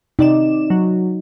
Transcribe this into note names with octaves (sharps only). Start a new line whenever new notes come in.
C3 D#4 D5 E7
F#3